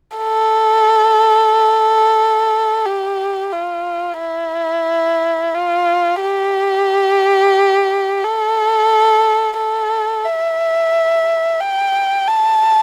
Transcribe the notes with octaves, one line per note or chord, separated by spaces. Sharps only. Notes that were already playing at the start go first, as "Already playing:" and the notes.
A4
G4
F4
E4
F4
G4
A4
A4
E5
G5
A5